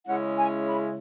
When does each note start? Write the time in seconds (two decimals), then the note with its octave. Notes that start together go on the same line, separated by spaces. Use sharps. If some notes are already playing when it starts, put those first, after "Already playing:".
0.06 C#3 G#3 C#4 E4 F#5
0.36 G#5
0.67 B5